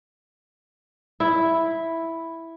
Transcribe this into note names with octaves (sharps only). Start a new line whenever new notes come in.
E4